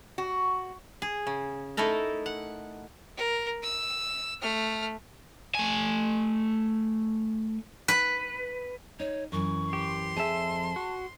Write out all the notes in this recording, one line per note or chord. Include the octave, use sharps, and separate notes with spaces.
F#4
G#4
C#3
A3 D#4 E4 A4 A#4
F#5
A#4
E6
A3 F6
A3 G#5
B4
D#4 C#5
F#2 E3 C#6
G4 C6
F2 G#4 E5 A5
F#4